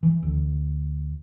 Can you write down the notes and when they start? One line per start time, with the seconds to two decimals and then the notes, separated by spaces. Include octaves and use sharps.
0.03 E3
0.23 D2